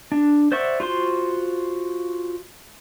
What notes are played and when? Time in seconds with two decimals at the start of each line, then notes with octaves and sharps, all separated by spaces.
0.12 D4
0.52 C5 D5 E5 F#5 C#6
0.80 F4 F#4 C5 C6